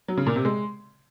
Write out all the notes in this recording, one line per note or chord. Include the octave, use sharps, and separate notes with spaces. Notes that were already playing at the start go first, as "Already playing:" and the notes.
F#3
C#3
A#2
C3
G#3